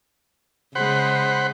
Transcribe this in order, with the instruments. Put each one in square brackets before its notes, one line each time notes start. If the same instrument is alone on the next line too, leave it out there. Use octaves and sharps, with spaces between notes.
[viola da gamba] C#3 G#3 [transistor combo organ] C5 F#5 B5